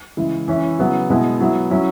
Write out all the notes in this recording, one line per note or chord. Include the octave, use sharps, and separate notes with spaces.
C#3 E3 G#3 E4
E3 C#4 E4
C#3 F#3 B3 E4
B2 G#3 B3 E4
F#3 B3 E4
F#3 C#4 E4